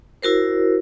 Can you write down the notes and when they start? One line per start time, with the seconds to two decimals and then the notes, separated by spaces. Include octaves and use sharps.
0.22 E4 F#4 A#4 C5